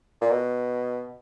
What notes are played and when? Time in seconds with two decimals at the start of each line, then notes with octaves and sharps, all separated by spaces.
0.21 A#2
0.31 B2